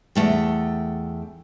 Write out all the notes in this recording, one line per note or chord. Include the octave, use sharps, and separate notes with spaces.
E2 A3 G5